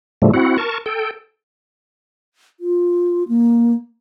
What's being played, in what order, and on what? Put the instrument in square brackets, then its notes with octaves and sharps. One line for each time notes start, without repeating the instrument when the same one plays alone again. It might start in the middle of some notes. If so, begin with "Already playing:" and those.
[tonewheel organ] A2 C#3 F3 G3 A3
C4 E4 F#4 F#5
A#4 A5 C#6
A4 G5
[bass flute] F4
A#3